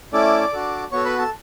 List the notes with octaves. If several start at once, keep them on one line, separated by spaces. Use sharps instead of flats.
A3 C#4 E4 A4 D5 D6
D4 F#4 A4
B3 F#4 A4 C#5 C#6
B4 B5
A4 A5